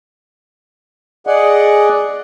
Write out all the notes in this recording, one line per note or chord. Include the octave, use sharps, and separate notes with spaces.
G#4 D5 D#5 F#5